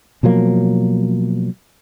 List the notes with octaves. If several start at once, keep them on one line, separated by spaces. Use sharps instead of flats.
B2 F3 F#3 A#3